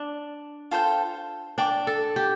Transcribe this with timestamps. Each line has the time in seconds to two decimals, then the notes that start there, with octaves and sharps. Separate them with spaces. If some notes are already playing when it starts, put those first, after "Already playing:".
Already playing: D4
0.71 F4 A4 C5 G5
1.58 D4 D5 G5 D6
1.87 A4
2.16 G4